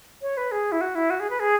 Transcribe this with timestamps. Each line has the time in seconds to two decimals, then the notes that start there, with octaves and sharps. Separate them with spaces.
0.22 C#5
0.37 B4
0.52 G#4
0.72 E4
0.81 F#4
0.95 E4
1.10 F#4
1.20 G#4
1.30 B4
1.40 G#4